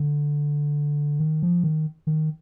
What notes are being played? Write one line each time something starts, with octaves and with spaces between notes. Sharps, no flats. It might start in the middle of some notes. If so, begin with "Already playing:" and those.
Already playing: D3
D#3
F3
D#3
D#3